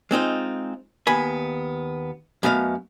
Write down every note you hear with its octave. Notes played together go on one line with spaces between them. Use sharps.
G#3 C4 D#4 F4
D#2 B3 G#5 B5
F#2 A3 B3 D#5 F5